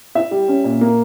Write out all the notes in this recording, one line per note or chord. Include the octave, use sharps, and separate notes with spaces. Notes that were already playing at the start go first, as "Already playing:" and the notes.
E4 E5
G3
C#4
A#2
A#3